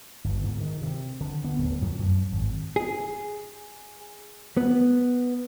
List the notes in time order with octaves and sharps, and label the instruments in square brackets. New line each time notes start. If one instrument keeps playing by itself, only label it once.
[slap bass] G1
G#2
D#3
C3
D3
B3
D1
F2
F#2
G#1
[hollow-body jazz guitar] G#4
B3